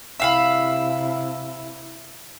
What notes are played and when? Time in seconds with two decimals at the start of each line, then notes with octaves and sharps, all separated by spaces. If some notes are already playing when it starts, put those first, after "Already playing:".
0.20 C3 E4 E5 F5 B5